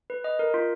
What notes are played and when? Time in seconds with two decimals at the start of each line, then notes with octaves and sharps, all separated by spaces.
0.10 B4
0.24 D#5
0.39 A#4
0.54 F4